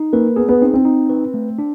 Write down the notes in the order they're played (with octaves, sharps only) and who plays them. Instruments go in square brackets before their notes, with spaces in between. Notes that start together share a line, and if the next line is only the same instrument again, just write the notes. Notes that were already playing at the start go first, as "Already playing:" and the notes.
Already playing: [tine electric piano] D#4
[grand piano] A#3 [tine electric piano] B4
[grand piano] B3 [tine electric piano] G#4
[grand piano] B3
[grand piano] C4 [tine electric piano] D#4
[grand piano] C4
[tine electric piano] D#4
B4
A3
D4